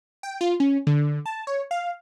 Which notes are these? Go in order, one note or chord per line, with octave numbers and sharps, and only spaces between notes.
G5
F4
C#4
D3
A5
C#5
F5